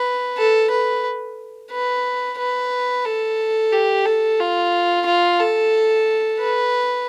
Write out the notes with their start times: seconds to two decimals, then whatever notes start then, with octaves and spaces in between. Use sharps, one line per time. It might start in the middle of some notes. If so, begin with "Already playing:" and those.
Already playing: B4
0.38 A4
0.71 B4
1.72 B4
2.39 B4
3.05 A4
3.72 G4
4.05 A4
4.40 F4
5.06 F4
5.40 A4
6.39 B4